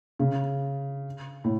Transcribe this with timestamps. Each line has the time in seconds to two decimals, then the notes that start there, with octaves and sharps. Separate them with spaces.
0.19 C#3
1.44 A2